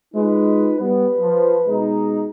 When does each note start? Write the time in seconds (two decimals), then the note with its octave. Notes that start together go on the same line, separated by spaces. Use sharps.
0.15 G#3 D#4 F4 B4
0.80 G3 B3 B4
1.18 F3
1.66 B2 G#3 D#4